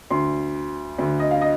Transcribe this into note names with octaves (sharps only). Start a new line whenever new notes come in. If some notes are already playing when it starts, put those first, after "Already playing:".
D2 D3 C6
D2 D3
D#5
F5
D#5